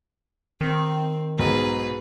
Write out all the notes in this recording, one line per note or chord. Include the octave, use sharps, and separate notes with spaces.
D#3 C4
B1 G#2 G#4 B4 A#5